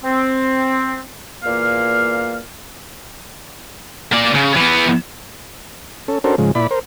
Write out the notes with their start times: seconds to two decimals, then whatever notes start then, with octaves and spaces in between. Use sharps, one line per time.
0.04 C4
1.43 E2 A#2 A#3 F5 F6
4.13 A#3 D5
4.36 C#3
4.57 E3 B3
6.08 C#4 A4
6.24 C#4 D4 F#4 A4 A#4 C5
6.38 G#2 C#3 F3 G#3
6.55 A#2 E4 D5 B5
6.71 A#4 C5